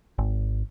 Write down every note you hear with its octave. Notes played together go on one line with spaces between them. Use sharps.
G#1